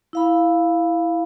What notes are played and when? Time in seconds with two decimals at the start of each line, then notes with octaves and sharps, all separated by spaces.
0.13 E4 F5 B5